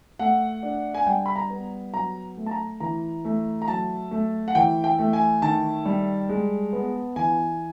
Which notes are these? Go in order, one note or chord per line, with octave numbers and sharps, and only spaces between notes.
A3 F#5
D4
G#5
G3 G5
B5
A#5
B3
F#3 A#5
A3
A5
A#5
E3 A#5
A3
A#5
F#3 A5
A3
F#5
E3 G5
G5
A3
G#5
D#3 A5
G3
G#3
B3
E3 G#5